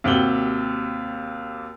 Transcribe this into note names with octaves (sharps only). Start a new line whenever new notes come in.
D#2 C3 F#4 F#7 G7